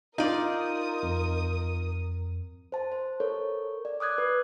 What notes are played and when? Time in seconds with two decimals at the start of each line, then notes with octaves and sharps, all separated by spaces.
0.18 D#4 F4 A#4 D5 D#6
1.03 F2
2.72 C5 A5
2.92 C5
3.20 A4 A#4 C#5
3.85 D5
4.00 D6 D#6 F#6 G#6
4.18 B4